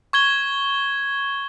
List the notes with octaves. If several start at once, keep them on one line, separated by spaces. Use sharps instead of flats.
C#6 G#6 G7